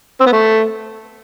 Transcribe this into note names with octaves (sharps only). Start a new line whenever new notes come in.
C4
B3
A3